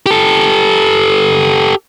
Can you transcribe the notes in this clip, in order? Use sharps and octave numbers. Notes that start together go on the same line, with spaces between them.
G4 A4